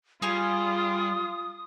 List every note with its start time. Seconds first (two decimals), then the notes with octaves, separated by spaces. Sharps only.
0.22 G3 F4 G#4 G#5 D#6 F6